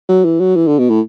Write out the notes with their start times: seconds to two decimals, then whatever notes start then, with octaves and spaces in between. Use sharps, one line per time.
0.09 F#3
0.24 E3
0.40 F#3
0.56 E3
0.67 D3
0.79 B2
0.90 A2